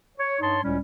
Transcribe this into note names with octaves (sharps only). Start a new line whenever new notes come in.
C#5
G2 D#4 C#5 A5 C6
C#2 A2 G3 C#4